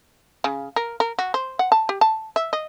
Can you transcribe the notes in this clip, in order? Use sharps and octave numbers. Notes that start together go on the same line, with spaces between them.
C#3
A#4
A#4
F#4
C5
F#5
A5
G4
A5
E5
D#5